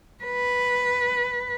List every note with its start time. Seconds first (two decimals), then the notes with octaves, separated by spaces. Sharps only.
0.24 B4